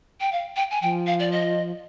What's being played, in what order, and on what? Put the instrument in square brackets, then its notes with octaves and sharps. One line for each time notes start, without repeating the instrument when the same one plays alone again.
[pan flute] G5
F5
G5
G#5
[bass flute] F3 [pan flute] G5
[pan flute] F5
D5
D#5